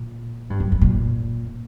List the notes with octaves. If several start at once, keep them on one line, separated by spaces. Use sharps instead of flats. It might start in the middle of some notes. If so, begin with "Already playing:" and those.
Already playing: A#2
G2
F#2
F#2
A#2